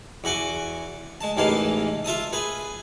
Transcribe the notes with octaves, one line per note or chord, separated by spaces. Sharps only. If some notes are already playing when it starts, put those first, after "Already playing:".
E2 F#4 G#5 D6
G#3 A5
A1 D#2 E3 G#3 F5 A5
F4 E5 A5 D#6
G#4 B4 G#5